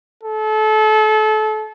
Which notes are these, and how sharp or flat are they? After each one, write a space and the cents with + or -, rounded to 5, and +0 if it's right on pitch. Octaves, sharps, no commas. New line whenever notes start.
A4 -30